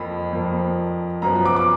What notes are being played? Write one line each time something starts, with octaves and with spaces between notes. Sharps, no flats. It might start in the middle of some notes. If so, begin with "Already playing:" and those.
Already playing: F2 F3 A#3 B5
F2 F3 A#3
F#2 F3 B3 A#5
D6
D6